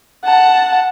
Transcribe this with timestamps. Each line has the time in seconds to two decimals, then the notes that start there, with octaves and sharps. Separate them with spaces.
0.25 F#5 A5